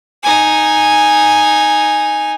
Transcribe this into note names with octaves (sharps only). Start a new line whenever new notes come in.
D#4 G#5